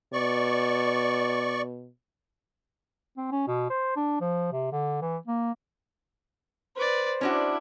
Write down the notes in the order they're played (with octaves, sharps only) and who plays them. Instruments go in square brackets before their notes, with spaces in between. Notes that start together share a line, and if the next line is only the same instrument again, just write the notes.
[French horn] B2 [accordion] D5 C#6
[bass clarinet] C4
C#4
B2
C5
D4
F3
C3
D3
E3
A#3
[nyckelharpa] B4 D5 [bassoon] C5
[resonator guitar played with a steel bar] C#4 D4 F#4 [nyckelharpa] E4